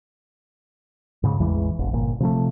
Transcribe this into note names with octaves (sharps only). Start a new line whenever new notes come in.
G#2 C#3
A1 E2 E3 G#3
E1 A1
G1 A#2
C3 F3 G#3 A3